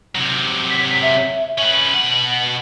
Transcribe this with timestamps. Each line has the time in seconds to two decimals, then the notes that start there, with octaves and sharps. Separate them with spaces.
0.15 C3 F#3
0.70 B6
1.02 E5
1.58 C#4 B4 F#7
1.94 B2 F#5